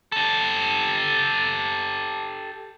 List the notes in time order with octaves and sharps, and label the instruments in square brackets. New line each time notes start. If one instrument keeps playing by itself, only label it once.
[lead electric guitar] G4 A4